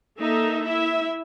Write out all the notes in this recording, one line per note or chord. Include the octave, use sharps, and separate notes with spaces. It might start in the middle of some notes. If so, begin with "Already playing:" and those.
A#3 D#4 A4 E5
E4 E5